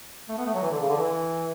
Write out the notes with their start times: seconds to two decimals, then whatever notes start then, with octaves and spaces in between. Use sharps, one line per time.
0.29 A3
0.37 B3
0.45 A3
0.54 F#3
0.62 E3
0.71 D3
0.80 C#3
0.89 D3
0.97 E3